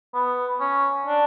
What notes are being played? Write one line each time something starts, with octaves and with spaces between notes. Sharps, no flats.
B3
C#4
D4